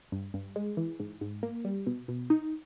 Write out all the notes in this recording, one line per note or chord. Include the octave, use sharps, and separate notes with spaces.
G2
G2
G#3
E3
G#2
G#2
A#3
G3
B2
B2
D#4